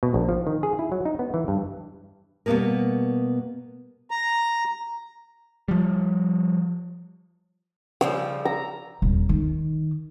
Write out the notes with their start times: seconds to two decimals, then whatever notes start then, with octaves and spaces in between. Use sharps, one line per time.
0.03 B2
0.14 A#1
0.29 F3
0.47 D#3
0.63 G#4
0.79 E4
0.92 F#3
1.05 D#4
1.19 B3
1.34 E3
1.48 G2
2.46 B2 G3 A#3 B3 G#4 A#4
4.11 A#5
5.68 F3 G3
8.01 C#3 F3 G3 E6
8.45 A#5
9.02 D#1
9.29 D#3